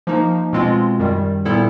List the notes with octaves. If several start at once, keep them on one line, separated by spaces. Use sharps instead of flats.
F3 A#3 D#4
B2 G#3 C4 F4
F#2 D#3 G3
A#2 G3 B3 E4 A4